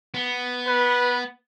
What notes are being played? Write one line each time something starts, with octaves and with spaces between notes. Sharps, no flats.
B3
B4